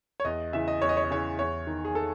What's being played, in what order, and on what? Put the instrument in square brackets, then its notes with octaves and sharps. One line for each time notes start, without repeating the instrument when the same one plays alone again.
[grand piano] C#5
E2 D#5
C#3 E3 E5
D#5
E2 C#5
D#5
C#5
D#5
C#3 E3 C#5
E2 C#5
D#3
G#4
A4